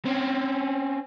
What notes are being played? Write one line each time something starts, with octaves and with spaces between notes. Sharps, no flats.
C4 C#4